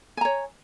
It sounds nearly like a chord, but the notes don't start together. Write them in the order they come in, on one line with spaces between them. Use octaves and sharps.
G#5 A#5 C#5